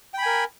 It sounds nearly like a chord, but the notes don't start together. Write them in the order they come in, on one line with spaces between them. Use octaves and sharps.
G5 B5 G#5 A#4